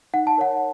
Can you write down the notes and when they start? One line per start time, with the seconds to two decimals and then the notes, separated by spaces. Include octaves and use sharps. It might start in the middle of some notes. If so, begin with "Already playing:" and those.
0.14 D#4 F#5
0.27 A5
0.38 A#4 C#5 F#5